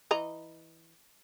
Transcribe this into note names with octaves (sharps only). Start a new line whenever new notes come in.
E3 D#5 A#5